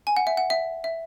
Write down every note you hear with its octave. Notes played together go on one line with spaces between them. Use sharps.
G#5
F#5
E5
F#5
E5
E5